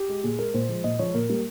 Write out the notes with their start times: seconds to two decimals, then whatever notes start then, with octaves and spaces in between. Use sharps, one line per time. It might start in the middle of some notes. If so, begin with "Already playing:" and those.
Already playing: G4
0.09 G#3
0.24 A#2 G#4
0.39 G#3 A#4
0.54 A#2 C5
0.69 F3 G#3
0.84 A#2 D#5
0.99 F3 G#3 C#5
1.14 A#2 A#4
1.30 G3 A#3